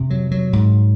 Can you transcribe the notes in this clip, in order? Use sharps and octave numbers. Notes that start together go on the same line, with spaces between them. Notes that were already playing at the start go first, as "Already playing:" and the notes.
Already playing: F2 C3
F#3
F#3
G#2